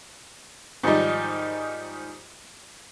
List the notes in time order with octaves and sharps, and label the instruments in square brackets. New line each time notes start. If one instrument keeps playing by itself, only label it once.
[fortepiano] G#2 D#3 F3 G3 D#4